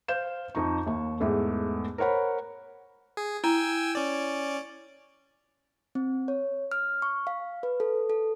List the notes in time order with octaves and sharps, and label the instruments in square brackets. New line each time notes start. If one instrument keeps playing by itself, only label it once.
[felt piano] C5 F5 G6 E7
F2 D#4 C#6
D#2 C#6
E2 G#2 A3
A#4 C5 C#5 F#5 B5
[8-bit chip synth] G#4
[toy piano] E4 [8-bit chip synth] G5 G#5 E6
[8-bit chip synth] C#4 D5
[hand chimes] C4
C#5
F6
C#6
F5
B4
A4
A4